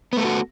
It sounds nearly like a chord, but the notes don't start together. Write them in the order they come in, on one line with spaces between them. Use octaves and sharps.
B3 A3 A4 F#4